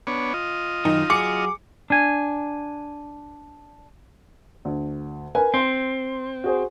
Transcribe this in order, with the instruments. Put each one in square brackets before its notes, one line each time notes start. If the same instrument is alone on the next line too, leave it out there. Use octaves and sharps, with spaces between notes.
[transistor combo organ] B3 D4 C#5
F4 D#5
[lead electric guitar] F#2 D#3 [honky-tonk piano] D#4
[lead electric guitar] F#3 G#4 [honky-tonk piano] D6 C#7
[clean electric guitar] D4 G#5
[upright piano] D2
A#4 B4 G#5
[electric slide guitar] C4 [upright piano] C6
[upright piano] F#4 G#4 C5